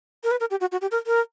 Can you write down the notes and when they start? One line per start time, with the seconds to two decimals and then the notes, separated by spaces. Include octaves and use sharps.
0.24 A#4
0.31 B4
0.40 A#4
0.50 G4
0.60 F#4
0.72 F#4
0.81 G4
0.91 A#4
1.06 A#4